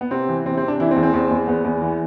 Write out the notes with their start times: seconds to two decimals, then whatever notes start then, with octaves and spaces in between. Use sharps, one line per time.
0.01 B3
0.11 C3 C4
0.29 E3
0.46 C3 C4
0.58 C4
0.63 C3
0.68 D4
0.80 E3 E4
0.91 C4
0.96 E2
1.03 C4
1.13 E2
1.31 E2
1.48 E2 B3
1.65 E2
1.82 E3